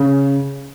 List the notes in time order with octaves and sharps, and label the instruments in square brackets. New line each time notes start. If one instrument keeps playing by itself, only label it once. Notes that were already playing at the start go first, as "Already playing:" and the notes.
Already playing: [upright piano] C#3